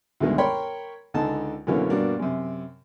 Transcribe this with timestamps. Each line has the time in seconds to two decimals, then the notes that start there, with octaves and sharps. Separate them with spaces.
0.20 D2 G2 B2 D#3 G#3
0.38 A#4 C#5 G5 B5 C6
1.14 C#2 D3 D#4 A5
1.67 F#2 B2 D3 E3 A#3 C#4
1.90 G2 B2 A#3 D4
2.19 F#2 C3